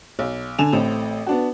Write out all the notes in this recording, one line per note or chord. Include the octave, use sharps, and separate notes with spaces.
B1
D3 G#5 E7 F7
A1 A2 C4
B3 D4 F#4